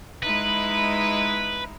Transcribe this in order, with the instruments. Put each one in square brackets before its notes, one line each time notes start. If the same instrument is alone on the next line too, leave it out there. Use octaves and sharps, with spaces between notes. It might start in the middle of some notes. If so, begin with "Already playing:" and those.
[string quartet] G#3 D#4 E4 [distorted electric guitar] B4